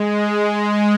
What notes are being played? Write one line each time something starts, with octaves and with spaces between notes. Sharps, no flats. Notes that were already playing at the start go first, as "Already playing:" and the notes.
Already playing: G#3